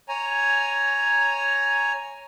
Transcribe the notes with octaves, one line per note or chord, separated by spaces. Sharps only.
C#5 G#5 A#5